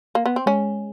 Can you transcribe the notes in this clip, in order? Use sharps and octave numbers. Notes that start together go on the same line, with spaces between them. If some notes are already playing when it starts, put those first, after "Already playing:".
A#3
B3
C4
G#3 C#4